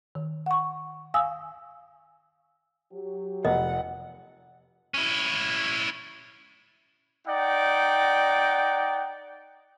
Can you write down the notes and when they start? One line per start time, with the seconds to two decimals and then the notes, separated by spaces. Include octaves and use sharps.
0.15 D#3
0.46 F#5 C#6
1.14 F5 G#5 D#6 E6
2.92 F#3 G4
3.45 F1 D#5 F#5
4.94 C#4 E4
7.26 D#4 D5 F#5 G5